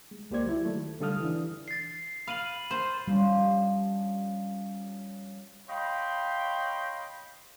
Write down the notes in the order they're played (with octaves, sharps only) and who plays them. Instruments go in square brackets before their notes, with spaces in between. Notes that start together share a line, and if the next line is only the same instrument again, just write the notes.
[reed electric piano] G#3
C#2 A#3 G4 C5 D5 G#6
F#3 E4
D#3 A3
D3 G3 A4 F5 D#6 F6
E3 D4
[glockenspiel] A6 C7
[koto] F5 [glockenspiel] B5 D#7 F#7
[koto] C5
[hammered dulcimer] F3 C#4 [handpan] G3
[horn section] C#5 D#5 F5 G5 B5 C6